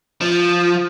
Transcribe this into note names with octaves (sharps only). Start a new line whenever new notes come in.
F3